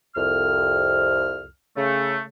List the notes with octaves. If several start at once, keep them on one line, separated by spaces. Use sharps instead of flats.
C2 F2 F6
C#3 A3